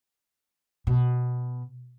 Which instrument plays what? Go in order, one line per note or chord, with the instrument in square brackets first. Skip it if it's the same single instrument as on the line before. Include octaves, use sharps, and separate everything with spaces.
[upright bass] B2